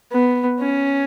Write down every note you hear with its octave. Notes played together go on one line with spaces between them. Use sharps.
B3
C#4